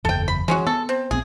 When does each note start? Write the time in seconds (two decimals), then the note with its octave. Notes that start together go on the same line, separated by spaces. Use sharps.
0.05 F#1 E2 A4 G5
0.28 B5
0.48 E3 G#3 C#4 F#4
0.67 B3 A4
0.89 C4
1.11 A#1 B3 C4 G#4